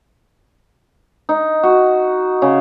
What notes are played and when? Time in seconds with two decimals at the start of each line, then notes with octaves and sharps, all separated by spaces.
1.29 D#4
1.63 F#4
2.42 C#3